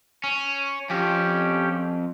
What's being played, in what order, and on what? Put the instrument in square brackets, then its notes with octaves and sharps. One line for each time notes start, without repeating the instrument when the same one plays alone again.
[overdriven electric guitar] C#4
[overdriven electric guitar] F2 [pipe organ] C#4 G4 G5